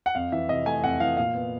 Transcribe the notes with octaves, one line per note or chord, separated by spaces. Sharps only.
F#5
F2 F5
E3 E5
C3 D#5
A3 G#5
F2 F#5
E3 F5
A#2 F5
B3